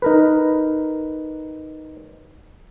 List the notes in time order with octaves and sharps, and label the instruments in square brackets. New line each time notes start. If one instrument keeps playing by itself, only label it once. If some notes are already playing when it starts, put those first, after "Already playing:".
[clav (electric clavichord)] D#4 A#4 B4